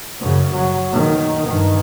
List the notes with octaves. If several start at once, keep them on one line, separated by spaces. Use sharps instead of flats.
F#2 C#3
F#3
D#3
G2 D#3